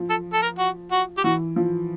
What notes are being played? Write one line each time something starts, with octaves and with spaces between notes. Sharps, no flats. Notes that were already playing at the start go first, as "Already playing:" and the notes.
Already playing: F3
A4
A4
A#4
F#4
F#4
G4
E3 F#4
F3